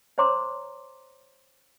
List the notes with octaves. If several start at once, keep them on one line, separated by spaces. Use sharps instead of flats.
C5 C#5 A#5 C6 D6